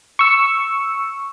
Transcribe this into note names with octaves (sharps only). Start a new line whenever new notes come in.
C#6 E6